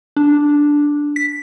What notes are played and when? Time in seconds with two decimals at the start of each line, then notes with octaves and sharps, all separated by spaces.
0.17 D4
1.16 B6